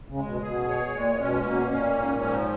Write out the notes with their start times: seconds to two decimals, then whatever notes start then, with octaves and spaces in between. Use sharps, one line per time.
0.09 C#3
0.17 G#3
0.25 B2
0.42 B2 G#4
0.68 C#5
0.93 A#2 G#3
1.20 B2 C#4
1.45 B2 A#3
1.71 A#2 C#4
1.97 G#2
2.22 F3